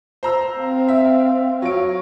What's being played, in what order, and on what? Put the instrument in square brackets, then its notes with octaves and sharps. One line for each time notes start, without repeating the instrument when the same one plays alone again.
[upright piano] C5 A#5 E6
[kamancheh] C4 F5
[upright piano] E5
[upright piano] F#3 D7 [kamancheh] C#5 F5